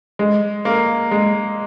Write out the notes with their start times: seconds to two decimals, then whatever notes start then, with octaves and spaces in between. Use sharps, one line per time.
0.19 G#3
0.65 A#3
1.11 G#3